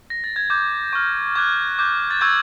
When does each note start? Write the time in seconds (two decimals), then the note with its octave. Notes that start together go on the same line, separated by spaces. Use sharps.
0.10 A#6
0.24 A6
0.36 G#6
0.50 D6 G6
0.93 C#6 F6
1.35 D6 F#6 G#6
1.79 D6 G6
2.10 A6
2.21 C#6 E6 G6 G#6